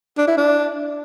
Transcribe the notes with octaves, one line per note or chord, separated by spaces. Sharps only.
D4
E4
D4